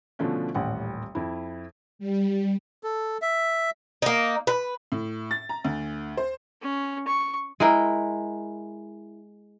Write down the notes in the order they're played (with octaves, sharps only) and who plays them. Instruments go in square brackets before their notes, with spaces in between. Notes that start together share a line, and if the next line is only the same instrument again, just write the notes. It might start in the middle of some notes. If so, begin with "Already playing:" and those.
[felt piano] B2 D3 F3 A3 C#4
D#1 A1 G3 F#5
F2 E4
[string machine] G3
[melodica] A4
E5
[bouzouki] A#3 D#4
B4
[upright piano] A2
A6
A#5
D2
C5
[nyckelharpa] C#4
C#6
[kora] G#3 E4 A#4 G5